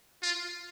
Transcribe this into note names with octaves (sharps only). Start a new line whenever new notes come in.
F4